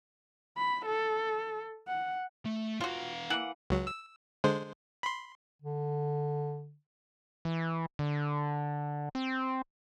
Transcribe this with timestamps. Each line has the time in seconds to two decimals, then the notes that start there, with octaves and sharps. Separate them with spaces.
0.57 B5
0.86 A4
1.88 F#5
2.45 A3
2.81 B3 F4 F#4 F5
3.30 E3 A#3 F#5
3.70 C#2 F#3
3.87 E6
4.44 D3 G#3 C5
5.03 B5 C6
5.62 D3
7.45 E3
7.99 D3
9.15 C4